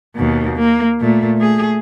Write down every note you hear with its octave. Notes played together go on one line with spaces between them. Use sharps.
D#2 B2
A#3
A#2 A3
A3 G#4